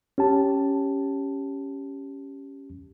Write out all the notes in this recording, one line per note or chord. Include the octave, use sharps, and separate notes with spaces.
C#4 G4 A5